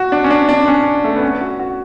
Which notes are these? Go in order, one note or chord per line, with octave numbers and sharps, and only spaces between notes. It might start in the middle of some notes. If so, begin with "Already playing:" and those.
Already playing: F#4
D4
C#4
D4
D4
C#4
A3
B3
C#4
F#4
F#4